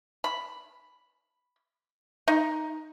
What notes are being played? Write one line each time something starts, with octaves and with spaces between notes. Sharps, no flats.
B5
D#4